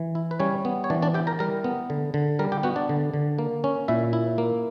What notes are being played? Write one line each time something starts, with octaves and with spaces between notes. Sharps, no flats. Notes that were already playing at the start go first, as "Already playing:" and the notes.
Already playing: E3
E4
B4
G3 C#4 C#5
B3
C#5
E3 D4 D5
D4 D5
E4 G4 G5
A#4 A#5
G3 A#4 A#5
B3
D3
D3
G3 A#4 A#5
G4 G5
B3 F#4 F#5
D4 D5
D3
D3
A#3
C#4
A#2 E4 E5
E4
A#3